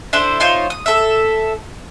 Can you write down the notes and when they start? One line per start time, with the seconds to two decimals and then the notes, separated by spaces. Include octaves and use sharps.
0.13 D4 E4 A4 C5
0.40 D#4 F4 C5 C#5
0.70 D#6
0.86 A4 E5